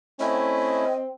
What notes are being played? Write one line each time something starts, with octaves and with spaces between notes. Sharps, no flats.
A3 C4 C#4 E4 D#5